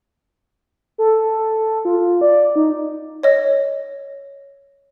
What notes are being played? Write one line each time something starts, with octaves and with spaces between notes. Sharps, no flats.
A4
F4
D5
D#4
C#5 D#5